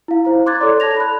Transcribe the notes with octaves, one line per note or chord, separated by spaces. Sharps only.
E4 F5
E4 C5 A#5
C6 D6 F#6 G#6 A6
A4 C#5 D5
A4 A5 G#6 A#6 F7
B5 F#6